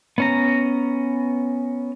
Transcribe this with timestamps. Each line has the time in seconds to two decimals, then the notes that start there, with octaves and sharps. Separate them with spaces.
0.18 B3 C#4 A#5